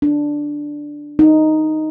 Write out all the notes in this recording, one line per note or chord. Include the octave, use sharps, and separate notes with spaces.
D4
D#4